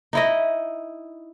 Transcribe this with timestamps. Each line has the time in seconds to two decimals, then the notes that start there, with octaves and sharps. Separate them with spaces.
0.13 D#4 E4 D#5